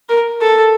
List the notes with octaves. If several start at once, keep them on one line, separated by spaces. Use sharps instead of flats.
A#4
A4